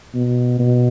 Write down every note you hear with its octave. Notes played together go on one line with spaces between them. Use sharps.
B2
B2